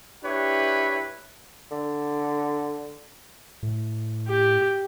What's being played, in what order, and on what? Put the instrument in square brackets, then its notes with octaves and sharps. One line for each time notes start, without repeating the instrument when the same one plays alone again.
[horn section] D4 E4 G4 B4 C#5
[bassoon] D3
[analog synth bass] A2
[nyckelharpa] G4